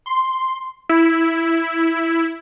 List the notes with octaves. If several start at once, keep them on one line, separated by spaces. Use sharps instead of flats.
C6
E4